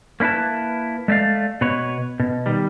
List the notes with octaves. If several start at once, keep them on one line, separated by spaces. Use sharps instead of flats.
A#3 C#4 E4 B4 A5
G#3 A3 D5 F5
B2 B4 C#5
B2
D#3 G3